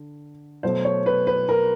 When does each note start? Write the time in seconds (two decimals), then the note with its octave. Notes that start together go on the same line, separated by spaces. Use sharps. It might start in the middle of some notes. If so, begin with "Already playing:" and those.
Already playing: D3
0.63 B2 F#3 A3 C5
0.85 C#5
1.06 B4
1.27 B4
1.49 A#4